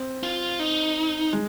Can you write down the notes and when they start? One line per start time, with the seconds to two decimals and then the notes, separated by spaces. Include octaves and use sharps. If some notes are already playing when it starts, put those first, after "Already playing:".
Already playing: C4
0.23 F4
0.59 D#4
1.33 G#3